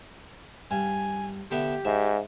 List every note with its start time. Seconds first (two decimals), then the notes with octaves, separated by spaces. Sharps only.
0.71 G2 G#5
1.51 D3 B3 G4 E5
1.85 G#2 E5